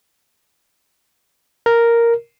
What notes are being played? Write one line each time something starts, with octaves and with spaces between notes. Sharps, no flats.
A#4